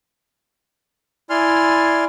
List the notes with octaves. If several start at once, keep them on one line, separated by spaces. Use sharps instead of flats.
E4 D5 G#5 C6 F6